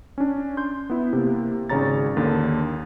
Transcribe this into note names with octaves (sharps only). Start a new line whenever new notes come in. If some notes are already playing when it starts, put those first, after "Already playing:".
C#4 D4
C6 G6
B3 E4
C3 A#3
G#1 C#3 C#5 A#5 A6
D#2 D3 D#3